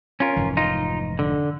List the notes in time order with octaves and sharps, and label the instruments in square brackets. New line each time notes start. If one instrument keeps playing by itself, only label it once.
[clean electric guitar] C#4 F4 A#4
[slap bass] F1 G#2 E3
[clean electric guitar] D#4 F4
D3